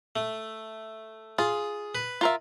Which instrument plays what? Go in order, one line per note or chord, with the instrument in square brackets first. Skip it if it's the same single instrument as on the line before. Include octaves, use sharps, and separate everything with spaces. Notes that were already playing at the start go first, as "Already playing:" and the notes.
[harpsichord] A3
[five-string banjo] F4 [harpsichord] G#4
[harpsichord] B4
[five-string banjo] F4 A#4 E5